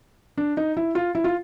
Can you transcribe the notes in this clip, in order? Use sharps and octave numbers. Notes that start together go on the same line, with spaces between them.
D4
D#4
E4
F4
E4
F4